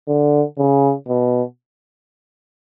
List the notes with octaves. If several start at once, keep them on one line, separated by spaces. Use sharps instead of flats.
D3
C#3
B2